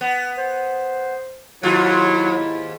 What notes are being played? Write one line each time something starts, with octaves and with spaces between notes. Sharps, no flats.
B3
C5
D#2 G#2 F#3 E4 F4